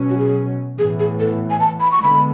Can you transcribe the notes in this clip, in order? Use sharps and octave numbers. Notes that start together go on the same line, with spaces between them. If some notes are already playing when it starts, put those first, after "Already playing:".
Already playing: B2 F#3 C#4
F#4
G#4
A2 E3 B3 G#4
G#4
A4
G#5
A5
B5
C#6
D3 G#3 B3 B5